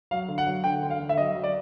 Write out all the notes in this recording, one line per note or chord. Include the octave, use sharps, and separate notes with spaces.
F#3 F5
D3
F#5
F#3
D3 G5
D3
F5
D3
E5
F#3 D#5
F#3
D5